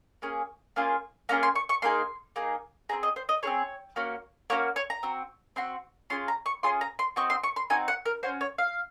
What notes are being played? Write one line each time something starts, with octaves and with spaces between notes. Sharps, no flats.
A#3 C#4 G#4
A#3 C#4 F4 G#4
A#3 C#4 F4 G#4 A#5
C6
C#6
C#6
A#3 D#4 G#4 C6
A#3 D#4 G#4
C4 F4 G#4 A#5
D#5
C5
D#5
C4 F4 G#4 C#5
A#3 C#4 F#4
A#3 C#4 F#4 C#5
C#5
A#5
C4 F#4
C4 F#4 C6
C#4 F4 G#4 C6
A#5
C#6
C#4 F4 G#4 C6
A#5
C6
C4 D#4 F#4 C#6
C6
C#6
C6
C4 D#4 F#4 G#5
F#5
A#4
C#4 F#4 C5
C#5
F5